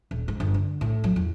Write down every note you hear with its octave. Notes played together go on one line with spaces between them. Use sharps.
D#1
G#2
G1
D3
A2
F#3
E2